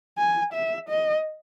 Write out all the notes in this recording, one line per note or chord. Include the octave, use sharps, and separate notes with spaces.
G#5
E5
D#5